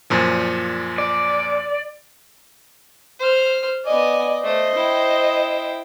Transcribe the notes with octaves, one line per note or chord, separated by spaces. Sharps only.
F#2 A#2 F3
D5
C5 F6
B3 D5 D#5 G#5
A3 C5 D#5
E4 G5